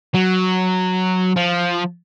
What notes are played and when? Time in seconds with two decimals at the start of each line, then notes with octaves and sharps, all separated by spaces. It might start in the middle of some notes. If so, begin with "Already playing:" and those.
0.14 F#3
1.36 F3